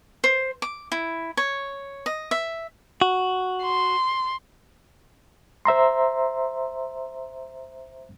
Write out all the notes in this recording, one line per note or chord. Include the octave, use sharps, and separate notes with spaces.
C5
D6
E4
C#5
D#5
E5
F#4
C6
C5 E5 A#5 C6